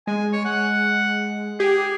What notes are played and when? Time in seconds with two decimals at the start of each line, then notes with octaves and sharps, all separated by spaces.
0.07 G#3 G#5
0.33 C#5
0.45 F#5
1.60 G4 G#4